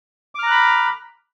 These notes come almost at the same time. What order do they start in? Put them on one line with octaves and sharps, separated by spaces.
D6 F6 A#5 F#6 B5